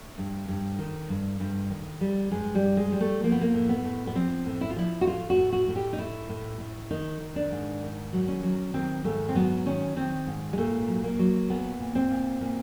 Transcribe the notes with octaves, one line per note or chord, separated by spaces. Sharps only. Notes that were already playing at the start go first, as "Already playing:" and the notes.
Already playing: A3
G2
G2
D#3
G2
G2
D#3
G3
G2 G#3
G3
G2
G#3
G3
A3
F3 A#3
B3
A#3
A2
B3
A2
B3
F3 C4
A2
E4
F4
F3 E4
F#4
A2 F4
F#4
A2
F#4
A2
G4
D#4
A2 E4
A2
A2
D#3 D#4
D#3
D4
G#2
D#3
F#3
C#4
F#3
D#3 C4
G#2 A3
C4
F#3 B3
D#3 C#4
D#3 C4
G#2
G#3
A#2 A3
F#3
A#3
F#3
A#2 B3
A#2
C4
A#2
A#2